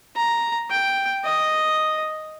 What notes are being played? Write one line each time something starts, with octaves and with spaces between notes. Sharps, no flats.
A#5
G5
D#5